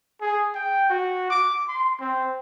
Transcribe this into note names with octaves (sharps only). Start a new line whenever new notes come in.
G#4
G5
F#4
D6
C6
C4